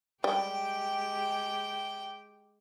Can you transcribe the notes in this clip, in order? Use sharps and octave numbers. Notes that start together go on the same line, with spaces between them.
G3 G#3 G4 G5